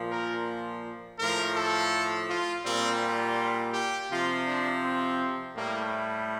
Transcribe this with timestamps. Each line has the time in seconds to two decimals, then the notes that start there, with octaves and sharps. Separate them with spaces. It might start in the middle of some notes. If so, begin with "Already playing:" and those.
Already playing: A#2 F3
0.10 A#4
1.19 A2 F3 A#4
1.56 A4
2.28 F4
2.64 A#2 G3 C4
3.02 F4
3.73 G4
4.10 C3 F3 F4
4.46 D4
4.83 C4
5.56 A2 G3 A#3